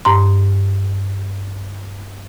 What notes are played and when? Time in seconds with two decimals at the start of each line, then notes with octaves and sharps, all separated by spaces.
0.05 G2 A#5 C6